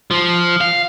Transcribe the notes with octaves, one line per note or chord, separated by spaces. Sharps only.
F3
F5